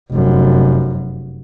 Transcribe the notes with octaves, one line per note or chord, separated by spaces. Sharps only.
F1 F#2